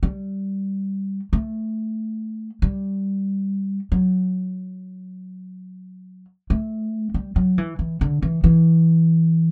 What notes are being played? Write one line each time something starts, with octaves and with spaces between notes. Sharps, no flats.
G3
A3
G3
F#3
A3
G3
F#3
E3
E3
D3
E3
E3